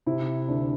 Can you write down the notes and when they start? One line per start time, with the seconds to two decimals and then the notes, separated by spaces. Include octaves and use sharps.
0.06 C3 E4
0.48 D2 D4